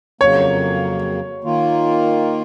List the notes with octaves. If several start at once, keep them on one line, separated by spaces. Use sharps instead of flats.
F2 C#3 F#3 A#3 C#5
D#3 A#3 F4